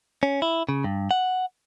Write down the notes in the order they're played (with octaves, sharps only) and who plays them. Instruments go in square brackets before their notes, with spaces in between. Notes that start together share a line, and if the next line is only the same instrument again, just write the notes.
[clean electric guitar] C#4
E4
C#3
G2
F#5